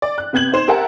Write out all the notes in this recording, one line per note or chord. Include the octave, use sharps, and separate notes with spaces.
D5
F#6
C3 B3 G6 G#6 F#7
D#4 C5 E7
G4 A#4 E5 F#5 A5